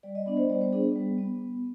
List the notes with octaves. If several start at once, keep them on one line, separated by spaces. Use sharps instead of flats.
G3 D5
D#5
B3 D4 D5
C5
G3 D5
C5
B3 D4 G#4
G3
B3